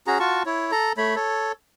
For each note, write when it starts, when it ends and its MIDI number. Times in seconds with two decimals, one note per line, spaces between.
0.07 0.19 61
0.07 0.19 66
0.07 0.19 68
0.07 0.19 82
0.20 0.43 65
0.20 0.43 66
0.20 0.43 81
0.20 0.43 85
0.46 0.71 64
0.46 0.71 73
0.72 0.93 69
0.72 0.93 82
0.97 1.16 57
0.97 1.16 73
0.97 1.16 83
1.16 1.52 69
1.16 1.52 73